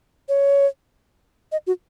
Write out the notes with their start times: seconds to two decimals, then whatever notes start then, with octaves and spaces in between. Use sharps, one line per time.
0.29 C#5
1.52 D#5
1.67 F#4